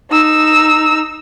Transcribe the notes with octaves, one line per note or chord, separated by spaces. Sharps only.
D#4 E6